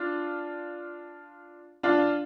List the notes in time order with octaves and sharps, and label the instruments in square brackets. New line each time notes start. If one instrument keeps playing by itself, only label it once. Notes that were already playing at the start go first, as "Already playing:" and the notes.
Already playing: [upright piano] D4 F4
D4 F4